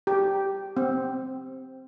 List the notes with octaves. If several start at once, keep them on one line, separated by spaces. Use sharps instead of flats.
G4
C4